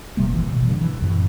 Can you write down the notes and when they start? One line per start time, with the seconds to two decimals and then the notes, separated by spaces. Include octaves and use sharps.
0.17 D#1 C3 G3 A#3
0.32 A1 E3
0.53 B2
0.67 G2 C#3
0.81 E3
1.02 F#2 A2 C3